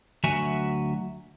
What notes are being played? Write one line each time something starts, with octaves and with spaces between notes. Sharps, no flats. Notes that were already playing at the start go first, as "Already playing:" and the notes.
D2 F#3 F#4 E5 G#5